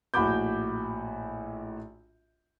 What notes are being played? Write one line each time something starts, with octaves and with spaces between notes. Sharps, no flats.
A#1 A2 F#4 B5 D6 G6